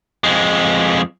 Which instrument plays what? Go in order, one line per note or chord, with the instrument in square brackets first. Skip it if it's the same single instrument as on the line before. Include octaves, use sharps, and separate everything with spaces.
[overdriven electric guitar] F2 G#3